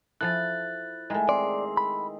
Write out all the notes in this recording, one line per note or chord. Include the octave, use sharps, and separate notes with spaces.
F3 E4 A4 F#6 A6
D#3 G#3 A3 D#4 E4
C4 G#4 D5 C6
B5